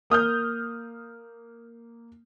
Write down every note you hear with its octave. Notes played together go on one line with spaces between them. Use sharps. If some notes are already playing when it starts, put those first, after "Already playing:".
A#3 D#6 F6 G6